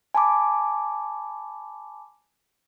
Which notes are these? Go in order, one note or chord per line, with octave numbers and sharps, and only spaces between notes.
G#5 A5 B5 D6